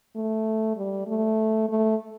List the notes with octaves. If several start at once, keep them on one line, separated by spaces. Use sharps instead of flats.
A3
G3
A3
A3